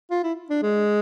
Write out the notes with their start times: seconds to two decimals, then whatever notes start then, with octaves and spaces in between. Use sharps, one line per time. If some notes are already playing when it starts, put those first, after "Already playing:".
0.11 F4
0.23 E4
0.50 D4
0.62 G#3